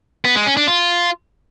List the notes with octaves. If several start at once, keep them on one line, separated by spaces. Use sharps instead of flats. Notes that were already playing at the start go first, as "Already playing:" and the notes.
B3
G#3
C#4
D4
F4